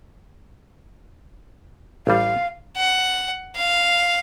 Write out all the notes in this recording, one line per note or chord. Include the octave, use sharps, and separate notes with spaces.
A1 G3 F5
F#5
F5